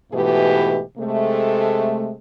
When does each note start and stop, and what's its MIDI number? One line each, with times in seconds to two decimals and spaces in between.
0.13 0.81 44
0.13 0.81 47
0.13 0.81 52
0.13 0.81 57
0.13 0.81 67
0.98 2.14 48
0.98 2.14 56
0.98 2.14 57